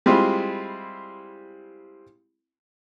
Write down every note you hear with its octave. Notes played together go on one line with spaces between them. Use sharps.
G3 G#3 C4 E4 F4